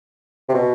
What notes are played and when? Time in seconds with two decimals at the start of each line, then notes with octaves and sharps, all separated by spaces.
0.49 C3
0.54 B2